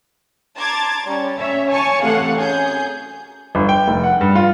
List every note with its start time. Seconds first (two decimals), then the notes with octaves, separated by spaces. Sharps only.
0.56 A5 A#5 C6 D6 G#6 A6
1.06 G3 C#4
1.38 C#4 C#5 E5
1.68 C#5 G#5 A5 C#6
2.03 A2 C3 E3 A3 F5 F#5
2.36 F#2 G#4 G6
3.55 G1
3.69 G5
3.88 F1
4.03 F#5
4.21 G2
4.35 F4